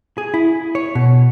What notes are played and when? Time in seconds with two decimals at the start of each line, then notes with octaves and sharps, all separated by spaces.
0.18 G#4
0.34 E4
0.75 C#5
0.95 B2